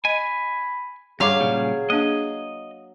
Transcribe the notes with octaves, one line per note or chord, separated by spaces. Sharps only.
D#5 G#5 B5
G2 F#3 G#4 F5 A#5 C6 D6
A#2 C#3 G3
A#3 D4 D#5